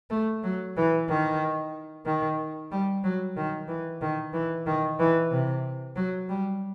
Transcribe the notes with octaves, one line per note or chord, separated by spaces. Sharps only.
A3
F#3
E3
D#3
D#3
G3
F#3
D#3
E3
D#3
E3
D#3
E3
C3
F#3
G3